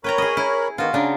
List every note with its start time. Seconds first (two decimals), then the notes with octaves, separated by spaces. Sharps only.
0.04 A#4 B4 C#5 G5 A#5 B5
0.18 G#4 D#5
0.37 E4
0.78 D#3 B3 F4 F#4
0.93 C#3 D4 D#4 G#5